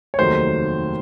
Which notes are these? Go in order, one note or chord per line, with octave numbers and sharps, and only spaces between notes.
C#5
F1 D#2 D#3 F#3 A3 C5